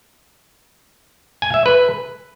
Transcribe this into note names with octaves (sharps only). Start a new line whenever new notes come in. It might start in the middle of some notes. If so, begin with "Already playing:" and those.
G#5
E5
B4